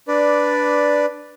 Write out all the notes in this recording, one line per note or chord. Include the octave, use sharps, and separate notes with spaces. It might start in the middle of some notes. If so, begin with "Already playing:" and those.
D4 B4 D5